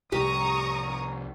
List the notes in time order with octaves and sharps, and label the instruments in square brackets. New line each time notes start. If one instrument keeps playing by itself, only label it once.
[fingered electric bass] C2 A2 [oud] G4 [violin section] A#5 C#6 D#6